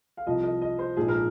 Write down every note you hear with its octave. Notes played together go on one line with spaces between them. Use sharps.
F5
C2 C3 F3 D#5
D#5
D#5
C5
A#1 G#2 F3 G#4
A#4